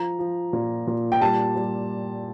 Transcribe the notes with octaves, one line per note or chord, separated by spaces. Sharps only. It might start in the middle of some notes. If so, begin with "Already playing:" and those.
Already playing: F3 A#5
F3
A#2
A#2
G5
G3 A5
G3